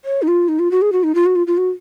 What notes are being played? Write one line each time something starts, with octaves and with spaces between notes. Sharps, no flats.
C#5
D#4
F4
D#4
F4
F#4
G#4
F#4
D#4
F4
F#4
F4
F4
F#4